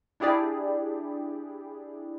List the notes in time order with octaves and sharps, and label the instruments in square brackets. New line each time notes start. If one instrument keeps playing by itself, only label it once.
[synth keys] D4 E4 G4 G#4 D5